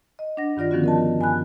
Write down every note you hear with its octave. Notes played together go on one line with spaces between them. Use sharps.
D#5
D4 F#5 A#6
G2 D#3 F4 D5 A#6
D3 D#3 F3 B3 C#4 F#4
A#4 D#5 A5
G2 G#5 B5 F#6